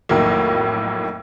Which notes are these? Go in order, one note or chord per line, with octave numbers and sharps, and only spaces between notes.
B1 F2 A2 D#3 F#3 A#3